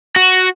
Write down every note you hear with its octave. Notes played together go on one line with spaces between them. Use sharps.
F#4